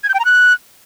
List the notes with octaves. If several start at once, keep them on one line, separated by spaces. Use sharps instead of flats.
G#6
G6
G5
A#5
F#6